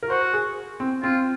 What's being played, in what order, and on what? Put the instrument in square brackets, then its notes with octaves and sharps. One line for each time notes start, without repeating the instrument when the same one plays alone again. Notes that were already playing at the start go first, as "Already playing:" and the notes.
[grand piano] A#4
[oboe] F#4 [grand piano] C5
[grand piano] G#4
C4
[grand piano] C4 [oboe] F4